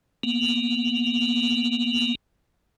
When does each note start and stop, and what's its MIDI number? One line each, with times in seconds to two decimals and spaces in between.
0.23 2.15 58
0.23 2.15 59